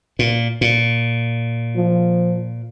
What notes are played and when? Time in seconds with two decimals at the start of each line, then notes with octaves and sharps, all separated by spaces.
0.19 A#2
0.61 A#2
1.76 F3